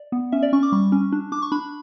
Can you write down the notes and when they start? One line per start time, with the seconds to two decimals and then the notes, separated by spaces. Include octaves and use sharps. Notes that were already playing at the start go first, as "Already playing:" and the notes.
Already playing: D5
0.12 B3
0.32 C#4 E5
0.43 D5
0.53 C#4 C#6
0.63 D6
0.72 G3 C#6
0.92 C#4
1.12 D4
1.32 D4 D6
1.42 C#6
1.52 D4 B5